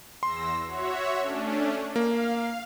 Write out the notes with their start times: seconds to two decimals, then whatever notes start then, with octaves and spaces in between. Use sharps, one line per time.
0.23 E2 C6 E6 A#6
0.66 F#4 C#5 E5
1.19 A3 C#4 D4
1.96 A#3 F5